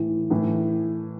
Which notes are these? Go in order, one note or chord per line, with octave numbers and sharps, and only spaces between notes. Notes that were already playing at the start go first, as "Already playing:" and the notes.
Already playing: A2 E3
A2 E3